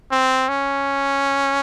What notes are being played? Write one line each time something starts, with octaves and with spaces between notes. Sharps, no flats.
C4
C#4